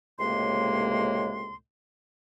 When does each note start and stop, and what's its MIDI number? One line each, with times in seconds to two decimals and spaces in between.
0.19 1.55 37
0.19 1.55 45
0.19 1.55 48
0.19 1.55 56
0.19 1.55 58
0.19 1.55 84